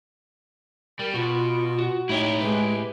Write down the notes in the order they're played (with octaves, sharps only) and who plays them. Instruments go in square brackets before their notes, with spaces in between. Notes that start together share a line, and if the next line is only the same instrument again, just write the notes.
[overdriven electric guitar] G3 [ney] A#4
[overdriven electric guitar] B2 [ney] F4 [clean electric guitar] F#4 B4
[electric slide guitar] F#4
[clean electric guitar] A2 [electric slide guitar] D#4 C#5 D#5 [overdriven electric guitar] E4 G4
[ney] G#3 [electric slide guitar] B4